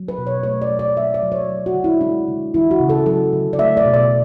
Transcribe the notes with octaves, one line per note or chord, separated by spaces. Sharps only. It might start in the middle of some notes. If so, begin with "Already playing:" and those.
Already playing: F#3
B4
B2
C#5
A3 C#5
D5
F#3
D5
A3 E5
D5
F#3
C#5
F#3
F#4
D3
E4
G#3 D4
D3
E3 E4
F#4
C#3
A4
F#3 A4
D3
D5
A3 E5
D5
B2
D5